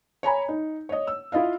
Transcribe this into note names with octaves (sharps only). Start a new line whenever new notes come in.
C#5 G#5 A#5 B5
D#4
C#5 D#5
E6
E4 F4 D#5 F5